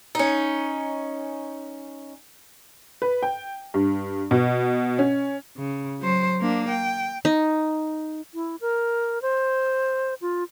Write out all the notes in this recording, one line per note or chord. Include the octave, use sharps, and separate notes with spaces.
C#4 D#4
B4
G5
G2
B2
C#4
C#3
F#3 C5
A#3 D4
G5
D#4
E4
A#4
C5
F4